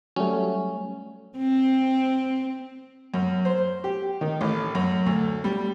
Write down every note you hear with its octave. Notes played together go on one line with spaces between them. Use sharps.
F#3 G3 A3 C#4
C4
F#2
C5
G4
D#3
A1
F#2
D2
G3